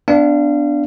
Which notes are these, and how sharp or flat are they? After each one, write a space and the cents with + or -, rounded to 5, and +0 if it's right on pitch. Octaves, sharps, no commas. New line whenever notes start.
B3 +25 D4 +0 F5 -30